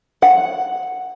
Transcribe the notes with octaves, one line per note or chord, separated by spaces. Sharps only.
F#5